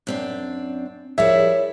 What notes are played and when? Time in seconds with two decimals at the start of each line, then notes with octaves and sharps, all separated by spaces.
0.07 F#2 C4 D4
1.18 F3 G3 E4 G#4 A#4 C#5 E5